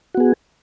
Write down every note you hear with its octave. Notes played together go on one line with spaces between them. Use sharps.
B3 F#4 G#4